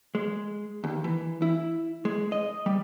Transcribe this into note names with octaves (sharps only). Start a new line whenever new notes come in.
G#3
D#2
E3
E4
G#3
D#5
G3